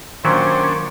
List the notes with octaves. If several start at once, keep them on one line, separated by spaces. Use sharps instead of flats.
A#2 D#3 F#3 C#4 D4 C5